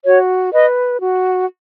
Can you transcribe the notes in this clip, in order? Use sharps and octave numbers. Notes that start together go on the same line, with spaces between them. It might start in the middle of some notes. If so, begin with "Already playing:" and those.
F#4 C#5
B4 D#5
F#4